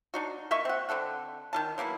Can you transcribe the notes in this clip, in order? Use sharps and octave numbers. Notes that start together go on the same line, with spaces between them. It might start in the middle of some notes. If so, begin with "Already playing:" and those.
D4 D#4 F#4
A#3 D#5 E5 C#6
C4 F#5
D3 C4 A4 F#5
D#3 F4 A5
F#3 A#3 B3 E4